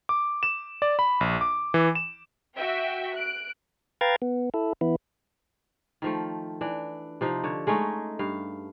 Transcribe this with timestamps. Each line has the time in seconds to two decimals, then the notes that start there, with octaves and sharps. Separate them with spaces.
0.09 D6
0.43 E7
0.82 D5
0.99 B5
1.21 A#1
1.41 D6
1.74 E3
1.95 E7
2.54 F#4 E5 G5
3.15 F#6 D7
4.01 B4 F5 G5 A#5 G#6 A6
4.22 B3
4.54 E4 A4
4.81 E3 B3 E4
6.02 D#3 F3 A3
6.61 E3 D4
7.21 C3 F3 D#4
7.44 D3 C#5
7.67 G#3 A3 C#4 D#4
8.19 G2 F5